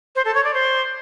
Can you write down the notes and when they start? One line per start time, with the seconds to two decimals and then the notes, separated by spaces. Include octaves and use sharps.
0.16 C5
0.25 A4
0.35 C#5
0.44 D5
0.54 C5